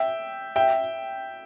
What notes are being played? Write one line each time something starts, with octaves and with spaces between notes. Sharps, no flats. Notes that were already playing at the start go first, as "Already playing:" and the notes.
Already playing: E5 G5
E5 G5